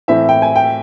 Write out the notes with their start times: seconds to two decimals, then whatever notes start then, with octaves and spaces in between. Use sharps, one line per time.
0.08 A2 E3 A3 C4 E5
0.29 G5
0.42 G#5
0.56 G5